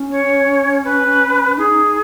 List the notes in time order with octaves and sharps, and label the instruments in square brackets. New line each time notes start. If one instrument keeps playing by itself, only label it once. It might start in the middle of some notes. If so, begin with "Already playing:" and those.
Already playing: [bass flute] C#4
[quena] C#5
B4
[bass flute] D#4 [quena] G#4